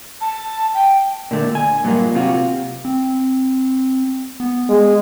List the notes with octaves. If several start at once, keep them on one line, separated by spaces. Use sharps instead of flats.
A5
G5
A#2 D3 A3
G#5
G2 A#2 E3 F#3 A#3
C3 F4 F#4
C4
B3
G#3